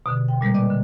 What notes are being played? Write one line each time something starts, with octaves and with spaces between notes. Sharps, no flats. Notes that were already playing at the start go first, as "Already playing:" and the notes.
B2 D3
G5
A#2 G3 G#3 A#3
B4 D5 D#5 D6
D3